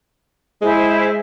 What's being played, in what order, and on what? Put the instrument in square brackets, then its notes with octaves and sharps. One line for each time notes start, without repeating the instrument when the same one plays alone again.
[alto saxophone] G#3 [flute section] E4 C5 G#5